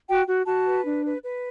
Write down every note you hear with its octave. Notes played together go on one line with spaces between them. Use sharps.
F#4 G5
F#4
F#4 A5
B4
D4
B4
B4